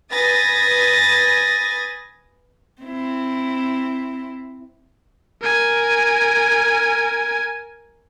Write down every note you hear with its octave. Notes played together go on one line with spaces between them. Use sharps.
B4 G#5 D#6 A6 A#6
C4 E4
A#4 G#5